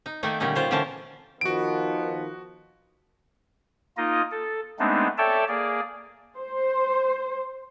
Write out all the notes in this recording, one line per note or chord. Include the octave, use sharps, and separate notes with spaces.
D#4
D#3 A3 A#3 D#4
A#2 D3 G3 C#4 D#4
G3 F4 C5 C#5
D3 E3 C#4 A#4 C5 A5
D#3 F3 B3 F#4 D7
A#3 D#4 F4 D#5
A4
G#3 A3 B3 C4 D4 D#4
A4 C#5 D5 E5 G5 A5
A#3 G#4 D5
C5